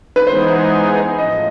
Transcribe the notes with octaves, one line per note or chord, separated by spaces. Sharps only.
B4
E3 G#3 B3 D#4 G#4 C5
A2 F3 D#5